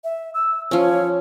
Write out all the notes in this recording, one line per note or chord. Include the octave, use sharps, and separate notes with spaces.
E5
E6
F3 C#4 C#5